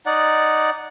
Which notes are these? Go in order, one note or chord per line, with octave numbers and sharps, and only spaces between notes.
D#4 D5 F#5